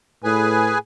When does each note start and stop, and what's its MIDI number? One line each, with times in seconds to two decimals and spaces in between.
0.24 0.76 45
0.24 0.78 68
0.24 0.78 71
0.24 0.78 80